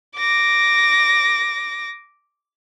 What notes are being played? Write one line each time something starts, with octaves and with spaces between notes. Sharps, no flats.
D6 A#6